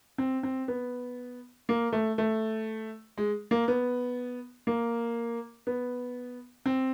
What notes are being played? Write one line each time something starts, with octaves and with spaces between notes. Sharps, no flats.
C4
C4
B3
A#3
A3
A3
G#3
A#3
B3
A#3
B3
C4